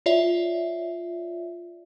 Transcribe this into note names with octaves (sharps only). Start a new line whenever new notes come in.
F4 C#5 D5 E5